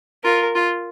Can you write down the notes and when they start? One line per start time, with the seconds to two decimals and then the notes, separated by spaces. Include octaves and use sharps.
0.24 F4 A#4
0.54 F4